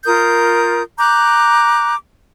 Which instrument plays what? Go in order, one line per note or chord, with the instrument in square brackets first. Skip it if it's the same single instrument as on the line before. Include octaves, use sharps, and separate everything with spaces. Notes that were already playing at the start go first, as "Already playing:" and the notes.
[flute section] F4 A#4 D#6 G6
A#5 D6 F#6 G6